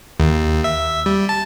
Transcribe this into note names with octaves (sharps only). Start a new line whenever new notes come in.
D#2
E5
G3
A5